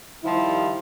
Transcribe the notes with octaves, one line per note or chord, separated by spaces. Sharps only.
D#3 F3 G3 E4